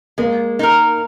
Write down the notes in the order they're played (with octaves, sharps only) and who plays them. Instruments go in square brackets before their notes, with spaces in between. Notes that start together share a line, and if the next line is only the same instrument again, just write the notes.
[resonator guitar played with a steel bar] G#3 [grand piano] A#3
[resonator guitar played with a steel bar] D#4 A#4